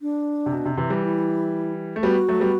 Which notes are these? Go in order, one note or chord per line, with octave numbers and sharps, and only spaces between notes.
D4
C3
B2
C3
C3 E3
E3 G3
E4
A3
G3 B3 F#4
F#3 A3
G3 B3